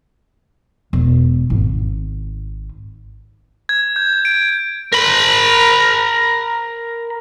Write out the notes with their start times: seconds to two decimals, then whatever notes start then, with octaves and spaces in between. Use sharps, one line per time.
0.93 E1
1.50 G#1
3.69 G#6
3.96 G6
4.25 D7
4.93 A#4 B5